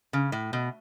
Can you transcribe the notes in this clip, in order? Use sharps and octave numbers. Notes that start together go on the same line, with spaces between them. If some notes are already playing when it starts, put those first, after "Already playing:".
C#3
A2
B2